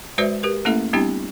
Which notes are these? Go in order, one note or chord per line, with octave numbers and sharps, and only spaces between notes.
G#3 F#4 B4 C5 D5 E5
G4 A#4 B4
A3 A#3 C#4 E4 A4 E5
G3 B3 C4 D4 E4 G4